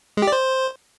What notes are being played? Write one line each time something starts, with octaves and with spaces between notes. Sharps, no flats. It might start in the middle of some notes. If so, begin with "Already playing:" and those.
G#3
G4
D5
C5